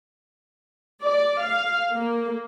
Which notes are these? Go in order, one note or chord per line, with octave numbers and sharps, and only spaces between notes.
D5
F5
A#3